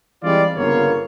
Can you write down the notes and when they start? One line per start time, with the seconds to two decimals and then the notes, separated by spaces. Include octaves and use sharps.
0.23 E3 G3 G#3 C4 F4 D5
0.56 G1 C#3 A#3 B3 F4 C#5